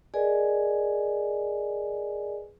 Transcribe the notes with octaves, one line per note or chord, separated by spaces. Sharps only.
G#4 A#4 B4 D5 D#5 G#5